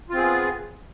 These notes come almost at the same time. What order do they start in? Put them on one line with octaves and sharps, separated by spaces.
F4 C4 G#4 B3